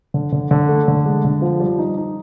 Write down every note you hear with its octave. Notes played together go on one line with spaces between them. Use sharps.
D3
D3
D3
A3
D3
G#3
D3
F3
G3
D#4
D#4